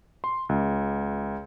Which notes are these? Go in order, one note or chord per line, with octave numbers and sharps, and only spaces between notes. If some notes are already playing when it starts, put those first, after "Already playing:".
C6
C#2